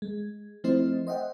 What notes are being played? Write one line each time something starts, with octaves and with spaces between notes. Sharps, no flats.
G#3
F3 A3 C4 E4 C5 D#5
C5 D#5 E5 F#5 G5